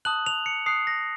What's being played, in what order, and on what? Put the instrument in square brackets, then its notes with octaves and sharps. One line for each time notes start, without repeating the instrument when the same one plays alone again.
[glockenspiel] A5 D#6 F#6 F#7
F7
C#7
A5 D#6 F#6 C7
A#6